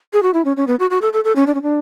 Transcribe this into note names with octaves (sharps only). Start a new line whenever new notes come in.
G#4
F#4
E4
C#4
C#4
B3
F#4
F#4
A4
A4
A4
C#4
D4
C#4
D4